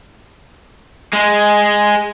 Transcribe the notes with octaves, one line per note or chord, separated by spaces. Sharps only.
G#3